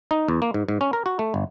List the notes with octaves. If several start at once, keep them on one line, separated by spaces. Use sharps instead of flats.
D#4
E2
A#3
G#2
G#2
C#4
A#4
F#4
A3
G1